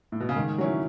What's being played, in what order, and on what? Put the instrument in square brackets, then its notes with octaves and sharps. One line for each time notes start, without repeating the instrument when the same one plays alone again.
[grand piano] A2
B2
C#3
[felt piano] G#2 [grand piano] D#3
[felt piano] F#3 C#4 E4